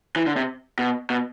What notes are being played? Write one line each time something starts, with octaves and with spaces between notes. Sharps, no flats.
E3
D3
C3
B2
B2